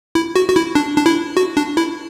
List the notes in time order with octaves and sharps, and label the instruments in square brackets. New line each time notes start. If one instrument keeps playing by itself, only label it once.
[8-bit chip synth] E4
F#4
F#4
E4
D4
D4
E4
F#4
D4
E4